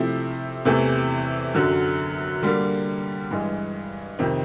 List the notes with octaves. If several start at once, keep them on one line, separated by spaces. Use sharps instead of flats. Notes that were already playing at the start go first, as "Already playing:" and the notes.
Already playing: C3 F3 A3 C4 E4
E2 C3 E3 A3
F#2 D3 F#3
D3 G3 A#3
G2 E3 G#3
F2 C3 D#3